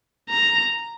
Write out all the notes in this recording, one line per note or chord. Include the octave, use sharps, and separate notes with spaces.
A#5